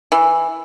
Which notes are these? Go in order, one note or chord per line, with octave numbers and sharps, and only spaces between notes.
E3